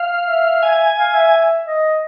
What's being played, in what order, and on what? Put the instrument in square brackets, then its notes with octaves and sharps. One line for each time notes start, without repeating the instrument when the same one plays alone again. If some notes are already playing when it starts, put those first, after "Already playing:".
Already playing: [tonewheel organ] F5
[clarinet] E5
[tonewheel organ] G#5
[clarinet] F5
E5
D#5